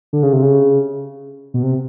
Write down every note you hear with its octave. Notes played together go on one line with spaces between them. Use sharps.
D3
C#3
C3
C#3
B2
C3